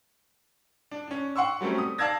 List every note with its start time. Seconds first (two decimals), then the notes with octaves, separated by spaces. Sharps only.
0.91 D4
1.08 C#4 D4
1.36 F#5 C6 C#6 E6
1.61 F#3 G3 A3 C4 C#4
1.78 D#6
1.98 D5 F5 A5 E6 G#6 A#6